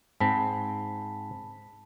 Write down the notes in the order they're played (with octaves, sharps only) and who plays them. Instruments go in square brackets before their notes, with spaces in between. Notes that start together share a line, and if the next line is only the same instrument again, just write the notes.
[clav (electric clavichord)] G#2 C4 [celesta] A5 B5 B6